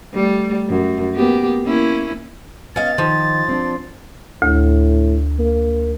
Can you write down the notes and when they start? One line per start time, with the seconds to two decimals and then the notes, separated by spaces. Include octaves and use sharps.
0.14 G3 A3
0.69 F#2
1.15 A#3 B3 G4
1.64 A#3 C#4 E4
2.76 B3 C#4 D#5 F5 A6
2.98 D#3 F3
3.49 C4 D4
4.42 D2 A2
5.39 A#3